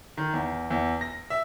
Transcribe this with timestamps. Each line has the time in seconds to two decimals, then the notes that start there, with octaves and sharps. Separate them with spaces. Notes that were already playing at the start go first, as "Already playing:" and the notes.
0.17 D#3
0.34 E2
0.70 E2
1.01 A#6
1.30 E5